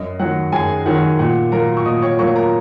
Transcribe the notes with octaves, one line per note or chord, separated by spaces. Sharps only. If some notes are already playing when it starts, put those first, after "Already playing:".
Already playing: F#2 D#5
D#3 F#3 F#5
F#2 G#4 G#5
D#3 F#3 F#5
A#2 F#5
F#3 A#3 A#4 A#5
C#6
A#2 D#5 D#6
C#5 C#6
F#3 A#3 C#5 C#6
A#4 A#5